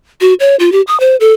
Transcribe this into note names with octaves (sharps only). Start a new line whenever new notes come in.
F#4
C#5
F4
G4
D#6
C5
A4